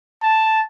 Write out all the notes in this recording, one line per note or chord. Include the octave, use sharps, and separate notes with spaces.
A5